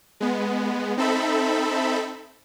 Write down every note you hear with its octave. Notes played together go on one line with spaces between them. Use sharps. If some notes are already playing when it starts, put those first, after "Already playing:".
G#3 B3
C4 D#4 A4 E5 B5